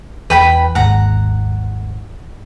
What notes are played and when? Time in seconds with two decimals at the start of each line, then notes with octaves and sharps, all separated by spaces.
0.30 E2 B4 G5 B5
0.75 G#1 D#2 G#2 F#5 A#5